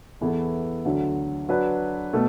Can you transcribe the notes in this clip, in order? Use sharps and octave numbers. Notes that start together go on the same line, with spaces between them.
E2 E3 B3 E4 A4
D2 D3 F#3
F#3 D4 B4
B2 A3